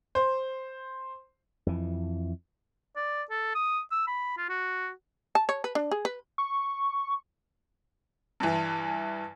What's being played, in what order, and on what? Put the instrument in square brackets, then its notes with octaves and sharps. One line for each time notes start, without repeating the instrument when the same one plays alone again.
[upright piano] C5
[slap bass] F2 E3
[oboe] D5
A4
D#6
E6
B5
F4
F#4
[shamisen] A5
C#5
B4
D4
G#4
B4
[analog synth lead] C#6
[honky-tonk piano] G2 E3